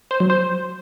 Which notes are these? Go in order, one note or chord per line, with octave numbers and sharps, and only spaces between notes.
C5
F#3
C5